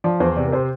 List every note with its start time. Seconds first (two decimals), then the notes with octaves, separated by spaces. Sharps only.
0.04 F3 D5
0.20 E2 C5
0.36 C3 D5
0.47 A#4
0.52 C3 C5